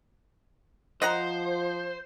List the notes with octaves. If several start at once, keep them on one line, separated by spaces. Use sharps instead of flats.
F3 C5 D#5 F#5 A#5